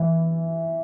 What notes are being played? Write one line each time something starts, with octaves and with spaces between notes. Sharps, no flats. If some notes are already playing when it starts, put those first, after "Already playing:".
Already playing: E3